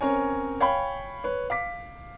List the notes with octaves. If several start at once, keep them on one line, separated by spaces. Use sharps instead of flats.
C4 C#4 A#4 C#5 G#5
C#5 F5 G5 G#5 B5
B4 C#5
F5 D6 B6